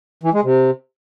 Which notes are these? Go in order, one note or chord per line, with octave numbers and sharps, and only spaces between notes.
E3
G#3
C3